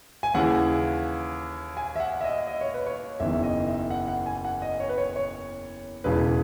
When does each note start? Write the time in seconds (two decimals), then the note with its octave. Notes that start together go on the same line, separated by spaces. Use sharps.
0.23 G#5
0.34 D#2 C#3 E3 F#5
1.77 G#5
1.96 E5
2.00 F#5
2.21 E5
2.24 D#5
2.47 D#5
2.61 C#5
2.74 B4
2.86 C#5
3.20 F#1 E2 D#3 E5
3.33 E5
3.43 D#5
3.67 E5
3.90 F#5
4.08 F#5
4.26 G#5
4.45 F#5
4.62 D#5
4.80 C#5
4.89 B4
4.98 C#5
5.16 C#5
6.04 E1 E2 C#3 E3 B4